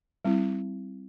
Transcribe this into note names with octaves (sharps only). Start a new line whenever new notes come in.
G3 C4 E4